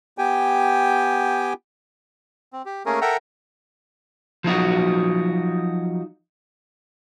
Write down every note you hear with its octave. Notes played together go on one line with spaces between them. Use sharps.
B3 G4 G5 G#5
C4
G4
A3 A#3 C#4 G#4 A#4
A4 A#4 E5 F#5 G5 A#5
F3 F#3 D#4 F#4